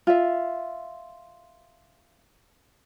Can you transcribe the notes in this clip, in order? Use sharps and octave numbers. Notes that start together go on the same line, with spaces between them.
F4 E5